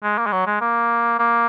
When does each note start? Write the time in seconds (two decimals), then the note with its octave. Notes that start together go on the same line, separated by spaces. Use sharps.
0.03 G#3
0.18 A#3
0.27 G#3
0.32 F#3
0.47 G#3
0.61 A#3
1.19 A#3